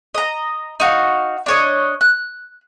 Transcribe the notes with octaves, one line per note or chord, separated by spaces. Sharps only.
D#5 A#5
D#4 F#4 F5
D4 C#5 D#5
F#6